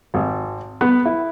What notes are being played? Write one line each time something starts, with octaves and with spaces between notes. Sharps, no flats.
G#1
B3
E4